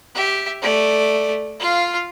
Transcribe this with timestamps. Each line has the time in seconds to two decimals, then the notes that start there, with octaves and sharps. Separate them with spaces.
0.15 G4 E5
0.62 A3 D5
1.60 F4 F5